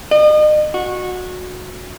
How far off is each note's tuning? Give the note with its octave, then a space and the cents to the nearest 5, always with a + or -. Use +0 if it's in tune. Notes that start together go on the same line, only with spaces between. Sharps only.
D#5 -40
F#4 -20